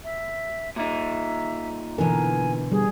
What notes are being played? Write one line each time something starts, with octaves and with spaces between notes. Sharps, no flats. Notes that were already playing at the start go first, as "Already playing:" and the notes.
E5
A#2 D#4 E5
B2 D3 E3 A#4 G#5
G3 G#4